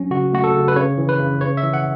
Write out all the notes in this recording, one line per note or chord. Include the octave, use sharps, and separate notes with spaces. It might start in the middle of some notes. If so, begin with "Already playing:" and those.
Already playing: F#3 C#4
C#3 F#4
A3 F#4
A4
C#3
B4
C#3 C#5
E3
B4
C#3
C#3 C#5
E5
E3
F#5